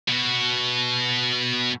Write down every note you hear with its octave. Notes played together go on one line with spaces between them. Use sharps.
B2 F#4